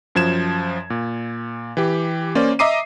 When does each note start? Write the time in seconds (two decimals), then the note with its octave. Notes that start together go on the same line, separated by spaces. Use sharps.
0.15 F#2 F3 G#6 E7
0.90 A#2
1.77 E3 G4
2.35 A#3 C#4 C5 D5
2.59 D#5 E5 A#5 D6 C7 D#7